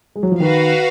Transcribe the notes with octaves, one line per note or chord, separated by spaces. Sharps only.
G#3
F#3
F3
D#3 F#4 B4 F5